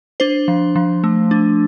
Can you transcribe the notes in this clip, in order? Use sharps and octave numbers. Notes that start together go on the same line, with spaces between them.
D4 C5
F3
F3
A3
D4